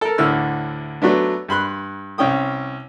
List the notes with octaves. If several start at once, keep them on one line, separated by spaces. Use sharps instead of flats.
A4 A#4
D2 A2 D3 E4 E6 F6
F#3 A3 B3 D4
G2 B5 C6 F#6
C2 C#4 G5 D#6